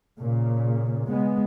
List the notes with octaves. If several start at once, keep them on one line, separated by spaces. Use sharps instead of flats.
A#2 C#3
G#3 B3